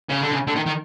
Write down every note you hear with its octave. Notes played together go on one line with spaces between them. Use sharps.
C#3
D3
C#3
D3
D#3
D#3